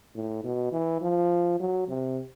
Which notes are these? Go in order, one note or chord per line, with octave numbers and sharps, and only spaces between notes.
A2
B2
E3
F3
F#3
C3